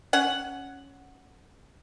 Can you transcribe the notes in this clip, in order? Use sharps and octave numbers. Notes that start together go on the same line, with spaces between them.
C#4 F#5